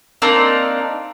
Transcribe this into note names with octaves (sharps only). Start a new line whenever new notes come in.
A#3 C4 D4 D#4